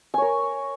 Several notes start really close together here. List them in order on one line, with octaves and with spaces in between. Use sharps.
G#5 C#5 A#4